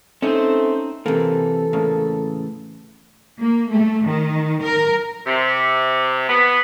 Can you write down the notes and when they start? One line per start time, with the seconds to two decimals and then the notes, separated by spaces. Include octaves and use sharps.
0.22 A3 C4 C#4 D#4 C5
1.06 C3 E3 A#3 A4
1.73 A2 C#3 A#3
3.39 A#3
3.70 A3
4.05 D#3
4.62 A#4
5.27 C3
6.28 B3